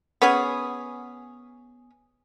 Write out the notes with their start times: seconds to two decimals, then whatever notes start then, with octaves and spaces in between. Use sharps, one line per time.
0.22 B3 C#4 G#4